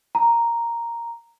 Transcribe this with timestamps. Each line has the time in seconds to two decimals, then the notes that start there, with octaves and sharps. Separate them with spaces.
0.15 A#5